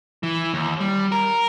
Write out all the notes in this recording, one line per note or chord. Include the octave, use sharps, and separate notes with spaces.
E3
D#2
G3
A#4